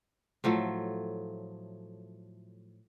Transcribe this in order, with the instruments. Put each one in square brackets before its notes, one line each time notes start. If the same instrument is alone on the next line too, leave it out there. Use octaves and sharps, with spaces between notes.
[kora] A2 F3 F#3 A3